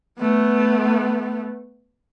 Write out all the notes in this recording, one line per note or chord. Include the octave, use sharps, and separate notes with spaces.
A3 B3